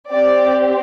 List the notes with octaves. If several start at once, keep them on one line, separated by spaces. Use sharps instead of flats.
C4 G4 D5